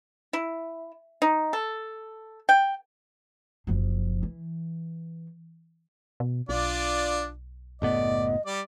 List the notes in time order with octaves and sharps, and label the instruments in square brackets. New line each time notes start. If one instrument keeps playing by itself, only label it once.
[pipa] E4
D#4
A4
G5
[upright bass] F#1 F3
E3
[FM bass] B2
[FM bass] B1 [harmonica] D4 F4 D5
[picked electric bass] F#1 A2 B3 [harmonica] D5 [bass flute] D#5
[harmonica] G3 D5 D6